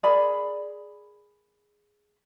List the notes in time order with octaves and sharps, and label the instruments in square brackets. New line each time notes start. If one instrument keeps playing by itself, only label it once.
[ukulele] G#4 A#4 D5 B5